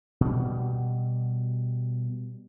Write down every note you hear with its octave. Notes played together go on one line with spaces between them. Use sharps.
B2 G3